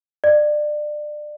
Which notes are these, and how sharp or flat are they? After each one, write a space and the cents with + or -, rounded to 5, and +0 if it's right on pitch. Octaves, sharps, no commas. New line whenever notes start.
D5 +25